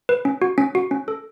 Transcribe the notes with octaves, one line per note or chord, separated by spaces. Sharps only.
B4
C#4
F#4
C#4
F#4
C#4
A4